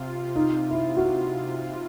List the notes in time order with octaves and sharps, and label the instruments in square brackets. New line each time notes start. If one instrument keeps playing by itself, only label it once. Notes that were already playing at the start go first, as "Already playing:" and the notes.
Already playing: [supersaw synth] C3 F4
[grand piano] D#4
E4
F#4